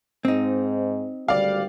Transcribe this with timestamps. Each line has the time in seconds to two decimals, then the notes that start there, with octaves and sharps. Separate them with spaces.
0.25 G#2 C4 D#4
1.28 G#1 D2 G3 D5 F5